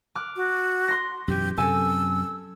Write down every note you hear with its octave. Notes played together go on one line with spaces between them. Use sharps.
D6 F6 F#6
F#4
C6 A#6
F#2 B2 E3 G4
F#2 C3 A4 G#5 E6